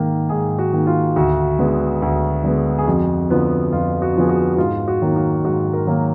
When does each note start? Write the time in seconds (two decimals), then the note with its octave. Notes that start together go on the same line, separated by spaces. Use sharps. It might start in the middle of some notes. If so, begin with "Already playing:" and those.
Already playing: G#2 D#3 A#3
0.29 G#2 G#4
0.59 F#4
0.73 D#3 A#3
0.87 F4
1.16 D2 F#4
1.59 D3 G#3 B3
2.02 D2
2.44 D3 G#3 B3
2.78 G#4
2.88 F2 F#4
3.30 D3 F3 B3
3.72 F2 F4
4.02 F#4
4.15 D3 F3 B3 G#4
4.29 F#4
4.54 F#4
4.58 G#2 F4
4.88 F#4
5.02 D#3 F#3 A#3
5.16 F#4
5.44 G#2 F#4
5.73 A#4
5.87 D#3 F#3 A#3